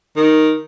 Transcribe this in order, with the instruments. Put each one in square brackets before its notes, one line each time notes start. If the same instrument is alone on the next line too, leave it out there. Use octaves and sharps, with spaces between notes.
[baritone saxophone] D#3